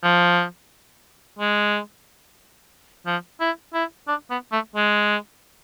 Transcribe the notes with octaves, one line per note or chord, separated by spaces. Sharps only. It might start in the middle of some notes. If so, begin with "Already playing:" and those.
F3
G#3
F3
E4
E4
D4
B3
A3
G#3